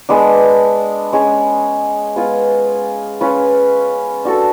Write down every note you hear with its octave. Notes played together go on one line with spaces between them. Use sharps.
G#3 B3 D4
G#3 C#4 G#4
G#3 B3 F4 G#4
C#4 F4 B4
D4 F#4 A4